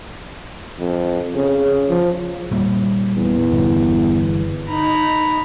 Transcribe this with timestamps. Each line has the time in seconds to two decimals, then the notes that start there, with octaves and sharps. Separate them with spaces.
0.79 F2
1.36 C#3
1.90 F3
2.51 A#2 G3 A#3
3.16 E2
3.51 G1
4.69 D#4 A#5 B5